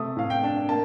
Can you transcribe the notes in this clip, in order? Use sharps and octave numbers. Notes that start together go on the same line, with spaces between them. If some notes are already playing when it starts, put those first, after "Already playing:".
Already playing: C3 A3 D#6
A2 F5
G5
D4
A#3 A5